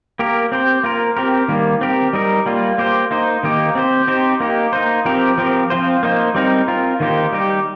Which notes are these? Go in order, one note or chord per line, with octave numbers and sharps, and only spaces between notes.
A#3 G4 A#4
C4 G4 C5
A#3 F4 A#4
C4 G4 A#4
D#3 G3 A#3
C4 G4 A#4
G3 D#4 A#4
G3 A#3 F4
A#3 G4 C5
A#3 D#4 C5
D#3 A#3 D#4 G4
C4 G4 C5
C4 D#4 G4 C5
A#3 D#4 G4
A#3 D#4 C5
F3 C4 G4 A#4
F3 C4 G4 A#4
F3 C4 F4 C5
A#3 D#4 C5
G3 C4 D#4 A#4
C4 F4 A#4
D#3 A#3 D#4 G4 C5
G3 D#4 G4